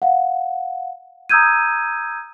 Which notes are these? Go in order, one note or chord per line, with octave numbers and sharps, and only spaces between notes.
F5 F#5
A#5 D#6 E6 G6 G#6 D#7